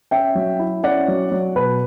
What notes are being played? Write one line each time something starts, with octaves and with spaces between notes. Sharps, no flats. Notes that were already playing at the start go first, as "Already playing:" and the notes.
C#4 E5 G5
F#3
E4
C#4 D5 F#5
F#3
F#3
B2 B4